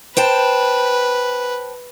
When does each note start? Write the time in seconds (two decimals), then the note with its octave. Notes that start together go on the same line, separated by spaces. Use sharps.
0.17 B4 C5 G5 A5